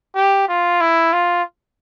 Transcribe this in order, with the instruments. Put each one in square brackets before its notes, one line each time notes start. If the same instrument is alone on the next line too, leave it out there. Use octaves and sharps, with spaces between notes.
[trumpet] G4
F4
E4
F4